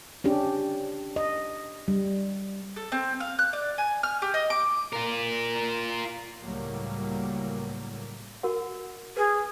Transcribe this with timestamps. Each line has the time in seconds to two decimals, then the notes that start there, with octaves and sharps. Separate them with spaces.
0.24 C#4 D4 G4
1.16 D#5
1.88 G3
2.76 A4
2.92 C4
3.20 F5
3.39 F#6
3.53 D5
3.78 G#5
4.03 F6
4.22 G4
4.34 D#5
4.50 D6
4.93 F4 A#4
6.41 C#2 A2 F#3 G3 A#3
8.43 F#4 A#4 F#5
9.17 G#4 B4